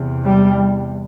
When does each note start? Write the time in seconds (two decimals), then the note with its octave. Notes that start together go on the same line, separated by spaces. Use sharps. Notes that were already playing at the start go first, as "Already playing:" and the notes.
Already playing: E2 C3
0.26 G3